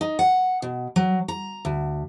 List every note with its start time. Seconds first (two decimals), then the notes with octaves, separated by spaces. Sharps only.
0.01 D#4
0.19 F#5
0.62 B2
0.96 F#3
1.28 A#5
1.65 D2